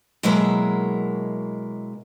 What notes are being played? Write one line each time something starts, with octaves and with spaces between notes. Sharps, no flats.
B2 F#3 G#3 A#3 E4 A#4